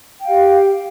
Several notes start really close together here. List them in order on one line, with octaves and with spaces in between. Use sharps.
G5 F5 G4